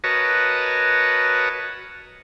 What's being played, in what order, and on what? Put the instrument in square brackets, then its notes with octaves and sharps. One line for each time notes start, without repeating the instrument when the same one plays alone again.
[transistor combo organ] F#4 A#4 B4 C#5 D#5 A5